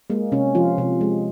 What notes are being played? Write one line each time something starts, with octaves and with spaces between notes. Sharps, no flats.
G#3 A#3
C3 C#4
F3 F4
C3
G#3